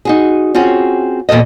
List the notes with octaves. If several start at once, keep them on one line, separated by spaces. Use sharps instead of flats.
D#4 F#4 G#4
C4 C#4 F4 F#4 G#4
E2 A#2 F4 A4 D#5